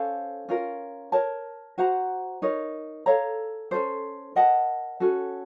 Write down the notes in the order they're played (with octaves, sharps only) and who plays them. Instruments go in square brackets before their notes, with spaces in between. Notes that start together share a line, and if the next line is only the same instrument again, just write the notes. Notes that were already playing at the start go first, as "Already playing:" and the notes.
Already playing: [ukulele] C#4 A4 C5 F5
C#4 F4 A#4
A#4 C#5 A5
F#4 C5 F#5 A#5
D#4 A#4 C#5
A4 C#5 F5 A#5
C#4 F4 A4 C5
A#4 D#5 F#5 A5
C#4 F#4 A4